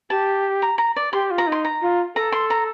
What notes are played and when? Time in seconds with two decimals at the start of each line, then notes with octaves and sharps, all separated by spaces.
0.10 G4 A5
0.62 A#5
0.78 A#5
0.96 D5
1.13 G4 C6
1.31 F4
1.38 A#5
1.47 D#4
1.52 C6
1.65 A#5
1.82 F4
2.15 A4 A#5
2.32 C6
2.50 A#5